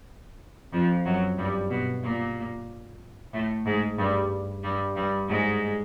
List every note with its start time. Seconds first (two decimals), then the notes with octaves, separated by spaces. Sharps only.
0.73 F2 F3
1.05 F#2 F#3
1.38 G2 G3
1.70 B2 B3
2.03 A#2 A#3
3.33 A2 A3
3.66 G#2 G#3
3.98 G2 G3
4.64 G2 G3
4.96 G2 G3
5.29 G#2 G#3